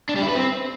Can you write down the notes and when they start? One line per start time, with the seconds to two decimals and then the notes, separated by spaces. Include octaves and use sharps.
0.09 D4
0.16 G3
0.22 E4
0.29 B4
0.35 C4